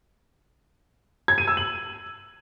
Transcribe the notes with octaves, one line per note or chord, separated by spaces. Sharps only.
G#6
D#7
E6
F#7